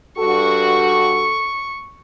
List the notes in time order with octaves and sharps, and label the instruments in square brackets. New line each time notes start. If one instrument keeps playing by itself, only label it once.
[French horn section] G2 F#4 [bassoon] A4 [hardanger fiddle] C#6